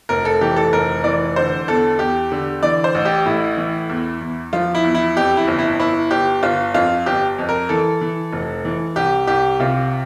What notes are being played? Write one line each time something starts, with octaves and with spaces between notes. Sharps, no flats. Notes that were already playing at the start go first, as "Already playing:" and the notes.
F1 A#4
A4
E3 G4
A4
F1 A#4
E3 D5
D3 C5
E2 A4
E2 G4
D3
E3 D5
C5
A1
G4
A2 E4
E3
E2
E2
F3 F4
E4
E2
E4
F2 G4
E4
G1
E4
G1 E4
G1 G4
G1 F4
F2 F4
G1 G4
F2
A#4
E3 A4
E3
F1
E3
C2 G4
C2 G4
C3 F4